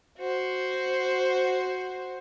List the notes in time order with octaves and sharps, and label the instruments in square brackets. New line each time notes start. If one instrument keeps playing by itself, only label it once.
[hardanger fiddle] F#4 C5